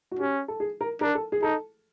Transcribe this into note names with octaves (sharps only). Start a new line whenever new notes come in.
F#4
C#4 G4
A4
G#4
A#4
D4 A#4
A4
G#4
D#4 A4